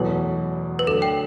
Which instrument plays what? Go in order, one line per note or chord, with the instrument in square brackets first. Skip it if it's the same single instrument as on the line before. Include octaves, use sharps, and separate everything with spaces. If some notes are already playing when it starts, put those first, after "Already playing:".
Already playing: [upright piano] E2 B2 F#3 A3 [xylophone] B4
[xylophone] B4
[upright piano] D2 D3 F#3 [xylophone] A4
[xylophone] G5